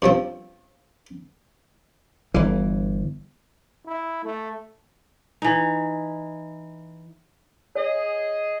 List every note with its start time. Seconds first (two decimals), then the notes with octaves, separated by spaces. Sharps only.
0.02 G2 F3 C4
2.34 G1 E3
3.86 E4
4.24 A3
5.42 E3 D#4
7.75 G#4 C#5 D#5